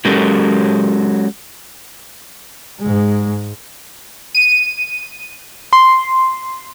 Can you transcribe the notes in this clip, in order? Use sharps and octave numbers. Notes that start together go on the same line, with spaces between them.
F#3 G#3 C#4 G4 A4 A#4
G#2 G#3
D#7
C6